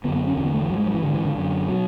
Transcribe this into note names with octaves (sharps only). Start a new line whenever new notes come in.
F#2 D3 B3
B3
C#4
E2 D3 C#4
B3
A3
E3
G#2 F#3
G#3
F#3
E3
G#2 D3
E3
D3
F#2 D3
B2 F#3